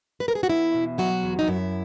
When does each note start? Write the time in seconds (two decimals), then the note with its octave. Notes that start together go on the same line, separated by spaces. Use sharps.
0.20 B4
0.28 A#4
0.35 G#4
0.43 F#4
0.49 E2 E4
0.74 B2
0.98 F#3 F#4
1.23 E2
1.39 D#4
1.48 F#2 E4